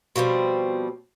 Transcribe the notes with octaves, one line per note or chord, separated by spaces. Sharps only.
B2 F3 G3 C4